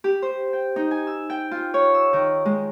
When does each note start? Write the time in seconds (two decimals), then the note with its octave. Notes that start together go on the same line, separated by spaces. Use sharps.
0.04 G4
0.22 C5
0.53 G5
0.76 D#4
0.91 G#5
1.07 E6
1.30 G5
1.51 F4
1.74 C#5
1.94 E6
2.13 D#3
2.45 G#3